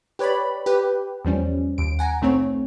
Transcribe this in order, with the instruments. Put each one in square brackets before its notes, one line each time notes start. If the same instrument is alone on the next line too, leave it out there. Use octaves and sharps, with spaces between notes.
[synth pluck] G4 B4 C#5 D5 B5
G4 B4
E2 F3 G3 C#4
D#2 D7
F#5 G#5 A#5
B1 A3 C4 C#5